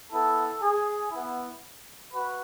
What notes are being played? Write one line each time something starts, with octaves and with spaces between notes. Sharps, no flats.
B3 E4 A4
G#4
B3 E4
F#4 B4